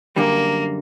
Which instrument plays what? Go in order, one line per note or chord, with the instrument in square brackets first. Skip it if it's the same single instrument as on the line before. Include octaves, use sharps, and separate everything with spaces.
[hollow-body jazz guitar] F#2 D3 G3 [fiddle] A#3